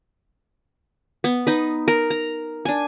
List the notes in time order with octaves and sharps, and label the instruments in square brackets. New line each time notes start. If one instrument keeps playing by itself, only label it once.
[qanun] B3
D#4 B4
A#4
A#5
D4 G#5